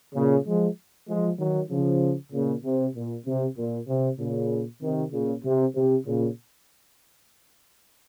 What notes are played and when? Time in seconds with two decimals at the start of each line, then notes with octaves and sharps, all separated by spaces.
0.15 A#2 C#3
0.46 F3 G#3
1.08 F3 G#3
1.38 D#3 F#3
1.70 C#3 F3
2.32 A#2 C#3
2.64 C3
2.95 A#2
3.26 C3
3.57 A#2
3.88 C3
4.19 A#2 C#3
4.82 C3 D#3
5.12 A#2 C#3
5.44 C3
5.75 C3
6.06 A#2 C#3